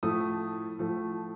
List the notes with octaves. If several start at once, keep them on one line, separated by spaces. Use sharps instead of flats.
A2 F3 A3 D#6
A2 F3 A3